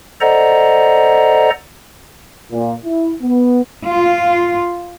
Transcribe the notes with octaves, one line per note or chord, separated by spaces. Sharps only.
A4 C5 D5 D#5 F#5 A#5
A#2
E4
B3
F4